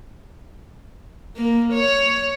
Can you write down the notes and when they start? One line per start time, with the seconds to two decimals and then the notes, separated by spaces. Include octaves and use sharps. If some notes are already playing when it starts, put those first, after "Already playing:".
1.36 A#3
1.73 C#5